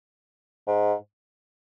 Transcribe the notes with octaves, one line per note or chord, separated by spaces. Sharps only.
G#2